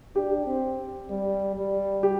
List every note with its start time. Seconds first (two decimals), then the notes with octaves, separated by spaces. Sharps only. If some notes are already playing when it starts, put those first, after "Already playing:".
0.15 D4 G4
0.46 C4
1.10 G3
1.56 G3
2.03 G4